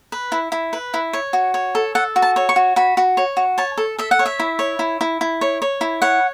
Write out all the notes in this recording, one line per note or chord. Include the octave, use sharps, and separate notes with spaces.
B4
E4
E4
B4
E4
C#5
F#4
C#5
A4
A4 F#5
F#4
A5
C#5
C#6
F#4
F#4 B5
F#4
C#5
F#4
C#5 A5
A4
A4 E5
F#5
C#5
E5
E4
C#5
E4
E4
E4
C#5
C#5
E4
C#5 F#5